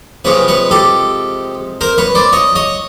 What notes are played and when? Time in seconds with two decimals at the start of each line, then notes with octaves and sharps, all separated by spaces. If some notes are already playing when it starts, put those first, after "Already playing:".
0.25 C3 F3 G#3 B4 C#5
0.48 B4 C#5
0.71 G4 A4
1.81 A#4 C5
1.98 B4 C#5
2.15 C5 D5
2.33 C#5 D#5
2.55 C#5 D#5